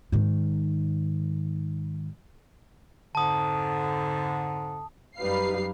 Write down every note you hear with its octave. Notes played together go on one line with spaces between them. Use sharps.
G#2 D#3
F2 G#2 D3 A5 D#6
F#2 G3 D#4 B4 F5 C7